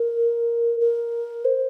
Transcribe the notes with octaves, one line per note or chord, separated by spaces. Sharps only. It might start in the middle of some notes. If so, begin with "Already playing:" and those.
Already playing: A#4
A#4
C5